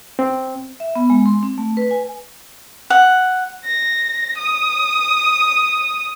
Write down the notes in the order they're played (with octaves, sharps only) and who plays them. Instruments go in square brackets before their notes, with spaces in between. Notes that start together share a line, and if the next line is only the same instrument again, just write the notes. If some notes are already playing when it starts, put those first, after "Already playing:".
[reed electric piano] C4
[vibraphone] E5
B3
G#3
C6
C4
A3
B4
G#5
[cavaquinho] F#5
[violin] A#6
D#6